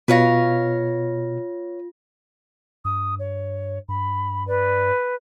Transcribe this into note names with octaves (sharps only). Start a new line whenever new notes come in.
B2 F4 B4 C#5 F5 A#6
G2 D#6
C#5
G2 B5
B4 D5